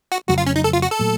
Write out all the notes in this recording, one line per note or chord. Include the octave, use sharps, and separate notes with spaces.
F#4
F2 C#3 F#3 A3 F#4
F4
C#4
D#4
A4
F4
F#4
A4
A#2 F#3 A3